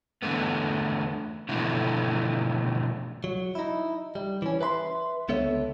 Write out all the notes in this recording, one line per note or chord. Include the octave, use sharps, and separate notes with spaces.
E2 D3 A3 B3
B2 D3 E3 F3 A3
F#3
D#4 E4
G3
E3 C#4
B4 E5 B5 C6
C#2 D3 B3 A4 C#5 E5